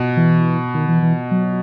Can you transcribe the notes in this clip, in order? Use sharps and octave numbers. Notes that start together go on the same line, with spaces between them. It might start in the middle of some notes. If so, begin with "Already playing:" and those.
Already playing: B2
E3
D#3
E3
E3
F#3